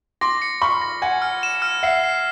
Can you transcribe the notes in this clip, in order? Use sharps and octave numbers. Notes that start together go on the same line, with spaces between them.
C6 D6 A#6
C#7
B5 C#6 F6
A#6
F#5 G#5 G#6
F6
E7
F6
E5 F#5 C7
C7